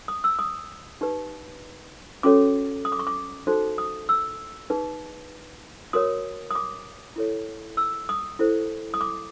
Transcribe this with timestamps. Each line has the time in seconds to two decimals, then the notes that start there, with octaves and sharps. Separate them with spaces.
0.08 D#6
0.24 E6
0.39 D#6
1.01 D#4 G4 B4
2.23 C#4 F#4 A4 C#5 D6
2.85 D#6
2.92 D6
2.99 C#6
3.07 D6
3.47 D#4 F#4 A4 C5
3.78 D#6
4.09 E6
4.70 D#4 G#4 B4
5.93 F#4 A#4 C#5 D#6
6.51 D#6
6.55 D6
7.16 E4 A4 C#5
7.77 E6
8.09 D#6
8.39 E4 A4 C5
8.94 D#6
9.01 D6